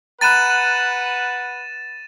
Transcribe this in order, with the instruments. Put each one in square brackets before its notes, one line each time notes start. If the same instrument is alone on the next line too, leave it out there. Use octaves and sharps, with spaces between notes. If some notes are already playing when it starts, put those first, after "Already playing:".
[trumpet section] B4 F#5 [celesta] A#5 B5 F#6 [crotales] A6 D#7 E7